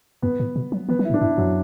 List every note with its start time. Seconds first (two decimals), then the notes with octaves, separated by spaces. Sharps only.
0.22 F#2 B3
0.40 A2
0.56 B2
0.72 F#3
0.89 E3 B3
0.99 F#3
1.05 E4
1.10 A2
1.14 D4
1.21 G2 E4
1.37 F#2 F#3